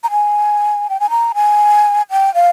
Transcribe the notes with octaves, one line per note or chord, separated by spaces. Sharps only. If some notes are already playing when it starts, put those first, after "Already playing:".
A#5
G#5
G5
G#5
A#5
G#5
G5
F5